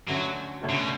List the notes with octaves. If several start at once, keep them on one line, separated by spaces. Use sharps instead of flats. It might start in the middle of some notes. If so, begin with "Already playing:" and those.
D2 D3 F#3 A3 C#4 F#4
D2 D3 A3 C#4 F#4
C#3
B2